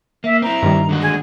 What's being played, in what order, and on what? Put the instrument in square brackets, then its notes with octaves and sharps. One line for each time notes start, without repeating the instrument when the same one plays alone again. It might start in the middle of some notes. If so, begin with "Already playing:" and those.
[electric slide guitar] A#3 [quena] E5
[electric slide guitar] C4 E4 [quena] A#5
[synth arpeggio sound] G2 D#3 G3
[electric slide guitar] D3 G#3 F#4
[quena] G#4